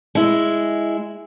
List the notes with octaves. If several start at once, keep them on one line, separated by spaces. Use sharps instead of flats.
G#3 E4